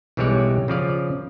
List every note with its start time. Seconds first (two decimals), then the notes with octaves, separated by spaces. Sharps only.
0.17 B1 E3 G3 G#3 C#5 D5
0.68 C#3 F3 D5 F5